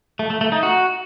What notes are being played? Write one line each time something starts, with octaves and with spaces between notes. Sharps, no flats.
A3
A3
A3
D#4
F#4